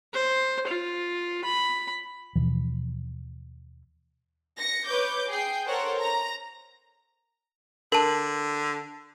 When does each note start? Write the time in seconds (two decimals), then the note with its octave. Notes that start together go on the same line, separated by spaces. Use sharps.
0.14 C5
0.67 F4
1.45 B5
2.36 D#2 B2 E3 F3
4.57 A#6 C#7
4.87 B4 C#5 D6 G6
5.29 G#4 G5 C7
5.67 A4 A#4 C5 C#5 F#5
6.00 A#5
7.92 D3 A#4 A5